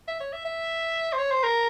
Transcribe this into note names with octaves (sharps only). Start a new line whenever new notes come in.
E5
C#5
E5
E5
C5
C#5
C5
A#4